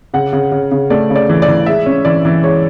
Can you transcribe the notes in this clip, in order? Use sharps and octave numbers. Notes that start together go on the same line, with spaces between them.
C#3 F#5
C#3
C#3
C#3
A3 D5
C#3
D5
E3
D5
E3
G#3 E5
C#4
E3 D5
E3
G#3 C#5